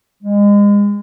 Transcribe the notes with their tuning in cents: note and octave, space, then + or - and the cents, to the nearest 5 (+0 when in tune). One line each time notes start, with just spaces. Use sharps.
G#3 -30